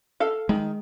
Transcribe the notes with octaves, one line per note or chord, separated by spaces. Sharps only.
A4 F5
D#3 G#3